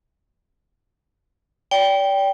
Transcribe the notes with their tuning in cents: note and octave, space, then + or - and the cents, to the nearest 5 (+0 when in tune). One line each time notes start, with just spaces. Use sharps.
D5 -35 G5 +0